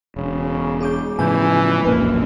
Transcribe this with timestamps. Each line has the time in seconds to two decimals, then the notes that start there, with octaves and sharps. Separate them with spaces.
0.16 E1 C#3
0.80 G#4 D6 G6
1.19 A2 C#3 E3 F3 G#5 G6
1.85 E1 A#1 F#2 A#3 B4